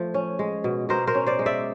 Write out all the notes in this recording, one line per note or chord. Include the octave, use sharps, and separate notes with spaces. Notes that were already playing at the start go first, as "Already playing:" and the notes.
Already playing: F3 A3
C#4
G#3
B2
B2 A#4 C5
A#4 C5
C#4
C5 D5
G#3
D5 E5